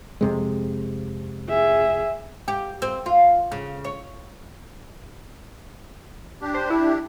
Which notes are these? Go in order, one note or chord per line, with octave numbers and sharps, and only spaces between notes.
F2 C3 G#3
G#4 E5
G4
C4
F4
C#3
C#5
D4 G4
C5
E4